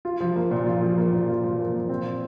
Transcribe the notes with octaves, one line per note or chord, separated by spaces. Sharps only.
F4
F3
A#3
A#2
F4
F3
A#3
A#2
F4
F3
A#3
A#2
C4
A#2